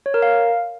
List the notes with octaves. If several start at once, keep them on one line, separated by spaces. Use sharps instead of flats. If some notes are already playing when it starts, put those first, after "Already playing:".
C#5
A#4
F5